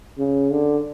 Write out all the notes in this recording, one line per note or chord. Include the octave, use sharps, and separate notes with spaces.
C#3
D3